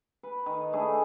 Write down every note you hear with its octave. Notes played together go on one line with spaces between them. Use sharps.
B4
D#3
A3 D4 E4 G#4